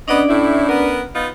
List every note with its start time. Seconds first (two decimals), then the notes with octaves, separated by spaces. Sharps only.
0.08 B3 C#4 D4 D5 D#5
0.29 A2 E4
0.68 B3 A#4
1.14 B3 D#4 F4